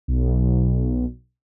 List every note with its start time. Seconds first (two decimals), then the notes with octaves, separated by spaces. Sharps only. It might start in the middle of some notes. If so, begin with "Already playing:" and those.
0.08 B1